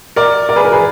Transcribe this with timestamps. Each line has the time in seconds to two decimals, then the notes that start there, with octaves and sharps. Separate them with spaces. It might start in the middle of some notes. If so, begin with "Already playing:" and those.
0.16 A#4 D5
0.49 A#4 D5
0.56 G#4 B4
0.65 A#4
0.72 G#4 B4